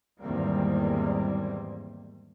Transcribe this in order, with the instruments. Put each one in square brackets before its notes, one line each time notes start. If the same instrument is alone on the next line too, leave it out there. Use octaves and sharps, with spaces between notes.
[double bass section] E2 G#2 D#3 G3 A#3 C4